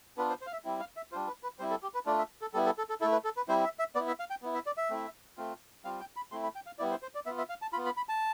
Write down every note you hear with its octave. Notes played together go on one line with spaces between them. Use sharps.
B3 D4 F4 B4
C5
C5
F5
E5
G3 C4 E4
F5
E5
G3 D4 F4 C5
B4
B4
G3 C4 E4 C5
A4
G4
B4
A3 D4 F4 D5
E5
A4
G3 B3 E4 A4
A4
A4
A4
A3 E4 A4
B4
A4
B4
G3 C4 E4 C5
E5
E5
B3 E4 D5
E5
F5
G5
B3 E4
E5
D5
E5
A3 C4 E4
A3 C4 F4
G3 C4 F4 F5
G5
B5
A3 C4 E4 C6
B5
G5
F5
G3 B3 E4 D5
C5
C5
D5
B3 F4 E5
E5
F5
A5
B3 F4 B5
B5
B5
A5